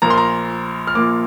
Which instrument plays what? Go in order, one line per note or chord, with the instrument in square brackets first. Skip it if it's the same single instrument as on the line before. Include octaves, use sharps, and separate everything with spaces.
[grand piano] A#1 A#2 A#3 A#5
C6
A#5
F6
A#1 A#2 A#3 D6